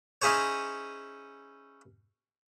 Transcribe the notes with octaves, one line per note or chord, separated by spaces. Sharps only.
C#4 D#4 E4 G#4 C5 C#5